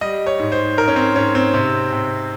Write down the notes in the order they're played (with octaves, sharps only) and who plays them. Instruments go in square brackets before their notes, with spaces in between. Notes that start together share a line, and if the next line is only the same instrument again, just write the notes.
[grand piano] G3 D#5
C#5
G#2
C5
G#2 A#4
C#4
C4
G#2 C#4
C4
C3
C3